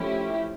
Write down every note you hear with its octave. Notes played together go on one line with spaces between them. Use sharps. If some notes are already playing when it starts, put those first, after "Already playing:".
Already playing: F3 A3 C#4 E4 G4